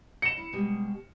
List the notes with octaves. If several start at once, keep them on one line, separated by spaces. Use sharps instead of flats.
D#5 C#7 E7
E4
B2 G3 G#3